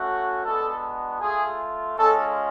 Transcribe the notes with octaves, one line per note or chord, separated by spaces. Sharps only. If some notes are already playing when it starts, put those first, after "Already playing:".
Already playing: A3 C#4 F#4
G#3 B3 D4 F#4 A4
A3 F4 G#4
G#3 C#4 F4 A4